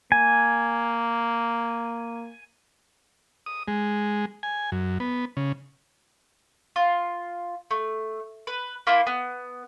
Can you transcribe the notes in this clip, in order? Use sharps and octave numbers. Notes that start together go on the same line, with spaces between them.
A#3 G#5
D#6
G#3
G#5
F#2
B3
C#3
F4
A3
B4
A#3 E4 F4 C5
B3